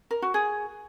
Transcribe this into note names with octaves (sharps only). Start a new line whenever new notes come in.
A#4
F#4
G#4